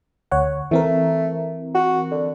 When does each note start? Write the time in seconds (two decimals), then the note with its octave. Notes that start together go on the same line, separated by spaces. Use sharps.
0.31 D2 C#5 F#5
0.71 E3 A3 C4 A#4
1.75 F#4
2.11 D3